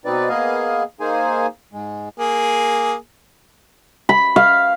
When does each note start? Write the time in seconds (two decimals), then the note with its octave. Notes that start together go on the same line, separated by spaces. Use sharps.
0.05 B2 C4 D#4 B4 D5
0.29 A#3 B3 G#4 D#5 F5 G#5
1.00 A#3 D#4 G#4 C5 G#5
1.73 G#2 G#3
2.18 A#3 G#4
4.09 B5
4.36 F5